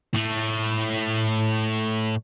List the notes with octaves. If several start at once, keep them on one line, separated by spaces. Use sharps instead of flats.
A2 A3